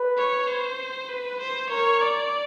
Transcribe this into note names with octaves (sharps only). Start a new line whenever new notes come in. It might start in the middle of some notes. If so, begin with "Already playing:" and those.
Already playing: B4
C#5
C5
B4
C5
A#4 C#5
D5